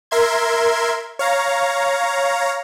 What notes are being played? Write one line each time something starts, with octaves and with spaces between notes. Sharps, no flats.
A#4 E5 C6 G#6
C#5 F5 A#5